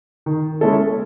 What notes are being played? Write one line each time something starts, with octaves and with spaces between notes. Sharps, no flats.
D#3
G#3 C#4 E4 A4